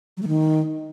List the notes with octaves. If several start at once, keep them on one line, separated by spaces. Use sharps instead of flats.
F#3
A3
D#3